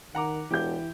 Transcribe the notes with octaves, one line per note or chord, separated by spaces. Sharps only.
D#3 F#5 A#5 D6
E1 E3 G4 G6